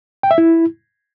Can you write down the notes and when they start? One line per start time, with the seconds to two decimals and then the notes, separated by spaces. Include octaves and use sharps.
0.23 G5
0.31 E5
0.38 E4